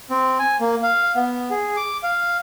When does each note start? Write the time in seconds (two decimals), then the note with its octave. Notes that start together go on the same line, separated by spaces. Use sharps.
0.10 C4
0.39 G#5
0.60 A#3
0.83 F5
1.16 B3
1.50 G#4
1.77 D6
2.03 F5